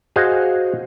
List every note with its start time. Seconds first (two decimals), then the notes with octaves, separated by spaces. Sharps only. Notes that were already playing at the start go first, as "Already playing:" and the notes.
0.16 F#4 G#4 C5 D#5 F5